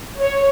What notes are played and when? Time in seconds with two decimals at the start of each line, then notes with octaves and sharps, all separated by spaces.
0.19 C#5